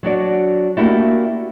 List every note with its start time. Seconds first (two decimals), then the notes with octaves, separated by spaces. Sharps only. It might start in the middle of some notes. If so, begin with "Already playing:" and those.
0.03 F#3 D4 F#4 D5
0.77 A3 A#3 D4 E4 F#4 G4